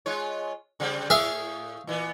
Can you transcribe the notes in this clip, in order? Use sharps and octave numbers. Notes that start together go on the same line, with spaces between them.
G#3 F4 C#5
C#3 G3 C4
A2 G#4 E5 F5
A#2 E3 B3